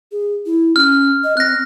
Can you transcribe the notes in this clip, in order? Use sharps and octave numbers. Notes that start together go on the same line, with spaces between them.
G#4
E4
C#4 F6
D#5
C4 F#6 A#6